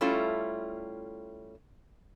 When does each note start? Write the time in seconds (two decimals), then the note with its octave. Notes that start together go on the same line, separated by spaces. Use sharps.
0.01 G3 A3 C#4 E4 F4